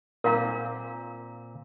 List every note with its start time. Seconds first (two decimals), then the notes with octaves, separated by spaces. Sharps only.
0.24 A#2 C4 A#4 F5 A#5